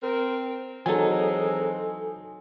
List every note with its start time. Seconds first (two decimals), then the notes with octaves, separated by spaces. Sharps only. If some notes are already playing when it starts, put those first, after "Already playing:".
0.02 C4 A#4
0.86 E3 F#3 G#3 C4 D#4 A4 G#5